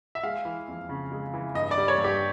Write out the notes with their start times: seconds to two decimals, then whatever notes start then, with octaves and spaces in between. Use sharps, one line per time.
0.15 E5
0.23 G#3 F5
0.45 E3
0.68 F2
0.89 C#3
1.12 G#3
1.34 E3
1.54 G2 D#5
1.71 D5
1.78 G3
1.88 C#5
1.98 G2
2.04 G4